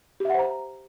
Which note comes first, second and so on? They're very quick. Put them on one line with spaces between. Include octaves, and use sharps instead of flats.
G4 E5 F#5 C5 A#5